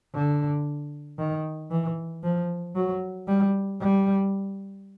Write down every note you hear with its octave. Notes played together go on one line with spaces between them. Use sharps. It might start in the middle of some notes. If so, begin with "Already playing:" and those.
D3
D#3
E3
F3
F#3
G3
G3